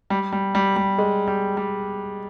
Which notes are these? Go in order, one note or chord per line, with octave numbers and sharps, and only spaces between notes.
G3
G3
G3
G3
G#3
G3
G3